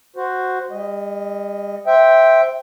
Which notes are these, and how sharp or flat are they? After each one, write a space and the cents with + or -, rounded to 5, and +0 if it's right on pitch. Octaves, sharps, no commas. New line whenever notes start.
F#4 +0 C5 -5
G3 +40 D#5 +0
C5 +0 E5 -10 G5 +0